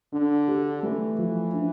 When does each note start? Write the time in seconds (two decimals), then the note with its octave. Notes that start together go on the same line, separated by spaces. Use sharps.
0.12 D3 D4
0.48 G4
0.83 E3 A3
1.18 F3
1.53 D4